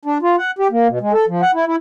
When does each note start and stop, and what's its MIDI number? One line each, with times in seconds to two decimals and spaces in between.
0.05 0.18 62
0.22 0.36 65
0.38 0.51 78
0.59 0.68 67
0.71 0.88 58
0.88 0.99 47
1.01 1.12 56
1.13 1.25 69
1.28 1.42 53
1.42 1.51 78
1.54 1.66 64
1.66 1.76 64